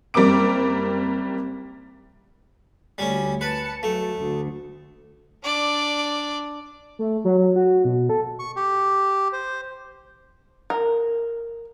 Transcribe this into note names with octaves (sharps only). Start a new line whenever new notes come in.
F#1 G3 C4 A#4 D6 D7
D2 G3 C#4
B4 A5 C#7
F#3 A3
D2
D4 D5
A3
F#3
F#3
F#4
B2
A4
C#6
G4
C5
A#4